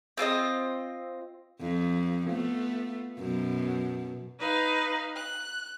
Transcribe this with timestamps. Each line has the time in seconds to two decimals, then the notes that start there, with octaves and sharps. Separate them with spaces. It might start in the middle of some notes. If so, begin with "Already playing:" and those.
0.18 C4 F4 A4 D#5
1.61 F2
2.27 A3 B3 F4
3.19 F#2 B2
4.39 D#4 B4 F5
5.15 F#6